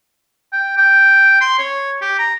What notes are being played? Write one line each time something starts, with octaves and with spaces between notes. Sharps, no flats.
G5
G5
C6
C#5
G4
A#5